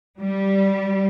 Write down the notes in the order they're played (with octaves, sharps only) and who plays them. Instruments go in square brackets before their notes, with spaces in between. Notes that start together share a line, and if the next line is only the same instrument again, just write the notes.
[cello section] G3